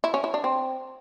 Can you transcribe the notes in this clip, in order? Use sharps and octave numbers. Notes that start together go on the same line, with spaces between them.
E4
C#4
E4
D4
C4